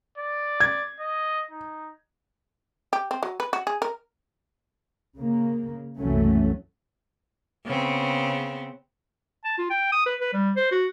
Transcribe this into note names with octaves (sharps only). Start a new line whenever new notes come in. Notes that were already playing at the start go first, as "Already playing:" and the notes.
D5
G#6
D#5
D#4
G4
C4
F#3
B4
F#4
G#4
A#4
C#3 A#3
F#1 C2 E3 F#3 A3 C#4
C#3 B3 C4
A5
F4
G5
D#6
B4
B4
G3
C5
F#4